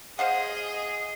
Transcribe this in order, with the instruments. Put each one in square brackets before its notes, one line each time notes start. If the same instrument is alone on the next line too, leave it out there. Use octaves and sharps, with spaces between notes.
[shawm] G#4 [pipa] C5 F5 F#5 [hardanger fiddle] D#5